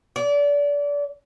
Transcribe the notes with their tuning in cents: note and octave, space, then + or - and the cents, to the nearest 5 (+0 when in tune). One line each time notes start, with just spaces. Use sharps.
D5 -30